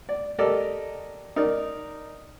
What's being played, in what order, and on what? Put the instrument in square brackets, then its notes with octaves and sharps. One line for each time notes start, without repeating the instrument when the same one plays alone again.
[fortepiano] D5
G4 A4 A#4 D5 D#5
D#4 A#4 D5